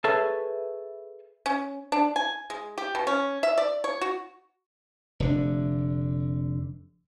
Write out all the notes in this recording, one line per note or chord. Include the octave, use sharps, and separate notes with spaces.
G#4 A4 B4 C#5 E5 A5
C#4
D4
G#5
G#3
G4
B2
C#4
E5
D5
C#5
F#4
F1 D3 D4